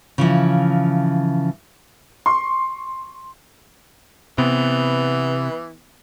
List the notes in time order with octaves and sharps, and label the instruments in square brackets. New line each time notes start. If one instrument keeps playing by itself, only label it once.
[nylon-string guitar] C#3 E3 F3
[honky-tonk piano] C6 C#6
[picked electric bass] C3 [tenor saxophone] E3 [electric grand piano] B3